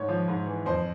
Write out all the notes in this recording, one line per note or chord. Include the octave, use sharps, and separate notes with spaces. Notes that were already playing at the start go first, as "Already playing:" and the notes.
Already playing: G#2 C#5
F3
G#2
E3
F2 C5